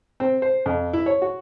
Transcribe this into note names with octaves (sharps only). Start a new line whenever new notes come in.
C4
C5
F2
E4
C#5
F#4